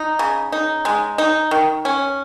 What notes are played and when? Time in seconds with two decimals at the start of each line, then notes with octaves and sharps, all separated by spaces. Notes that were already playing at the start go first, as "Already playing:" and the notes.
Already playing: D#4
0.19 C#3
0.52 D#4
0.85 G#3
1.18 D#4
1.51 D#3
1.85 C#4